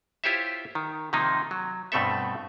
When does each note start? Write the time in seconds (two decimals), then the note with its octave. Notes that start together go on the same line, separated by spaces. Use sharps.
0.24 E4 F4 G4 C5 C#5 E5
0.75 D#3
1.13 C3 D#3 F3 A#3 D#4
1.51 F#3
1.92 G2 B2 A3 C4 A4 E5